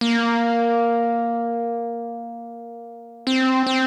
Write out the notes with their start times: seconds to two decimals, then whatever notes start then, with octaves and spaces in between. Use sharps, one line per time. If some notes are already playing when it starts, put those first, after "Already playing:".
0.01 A#3
3.27 C4
3.67 C4